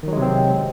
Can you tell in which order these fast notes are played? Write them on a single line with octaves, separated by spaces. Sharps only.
D#3 F#3 G#3 C3 C4